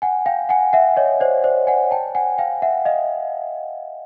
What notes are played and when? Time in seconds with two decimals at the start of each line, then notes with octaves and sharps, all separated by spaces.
0.02 F#5 G#5
0.26 F5 G5
0.49 F#5 G#5
0.73 E5 F#5
0.97 C#5 D#5
1.20 C5 D5
1.44 C5 D5
1.67 F#5 G#5
1.91 G5 A5
2.15 F#5 G#5
2.38 F5 G5
2.62 E5 F#5
2.85 D#5 F5